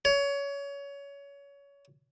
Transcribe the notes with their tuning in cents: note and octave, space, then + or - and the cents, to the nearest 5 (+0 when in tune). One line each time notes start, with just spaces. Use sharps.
C#5 +25